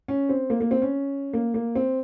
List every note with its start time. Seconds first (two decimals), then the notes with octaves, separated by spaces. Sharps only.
0.08 C#4
0.29 C4
0.50 A#3
0.61 A#3
0.71 C4
0.82 C#4
1.33 A#3
1.54 A#3
1.75 C4